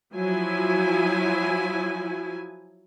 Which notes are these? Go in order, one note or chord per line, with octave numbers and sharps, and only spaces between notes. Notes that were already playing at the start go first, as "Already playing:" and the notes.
F3 F#3 E4 G#5